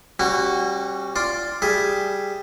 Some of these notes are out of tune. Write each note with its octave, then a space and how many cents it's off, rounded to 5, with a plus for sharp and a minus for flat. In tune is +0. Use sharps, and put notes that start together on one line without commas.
G3 +0 C#4 -35 F#4 +0
F4 +0 D5 +0 C6 +0
G3 +0 G#4 +0 E5 +0